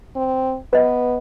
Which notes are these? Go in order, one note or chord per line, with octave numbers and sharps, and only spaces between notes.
C4
B3 B4 D#5